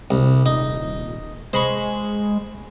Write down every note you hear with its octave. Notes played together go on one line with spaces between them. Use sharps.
C2
D#1 D#4
G#3 C5 B5 C#6